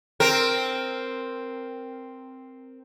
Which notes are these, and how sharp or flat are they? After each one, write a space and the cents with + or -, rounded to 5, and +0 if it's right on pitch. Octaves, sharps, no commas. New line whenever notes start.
C4 +0 A#4 +0